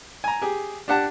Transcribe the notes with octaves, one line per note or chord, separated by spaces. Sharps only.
G#5 A#5
G4 G#4
D4 G4 F#5 A5